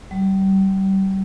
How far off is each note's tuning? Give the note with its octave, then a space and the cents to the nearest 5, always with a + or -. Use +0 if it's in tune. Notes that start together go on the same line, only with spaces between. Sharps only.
G3 -30